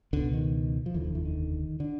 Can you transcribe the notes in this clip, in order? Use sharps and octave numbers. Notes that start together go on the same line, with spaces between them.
C#2 B2 D3
D#3
F3
F1 D#2 D3 E3
F3
E3
D#3
D3